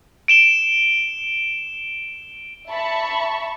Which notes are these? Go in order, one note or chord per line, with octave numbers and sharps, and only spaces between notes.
D7 E7 G7
E5 A5 B5 C#6